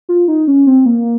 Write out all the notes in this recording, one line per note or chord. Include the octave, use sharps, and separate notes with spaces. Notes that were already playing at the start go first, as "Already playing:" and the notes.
F4
D#4
C#4
C4
A#3